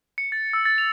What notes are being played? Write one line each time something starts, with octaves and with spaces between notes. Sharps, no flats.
C#7
A6
E6
A6
F7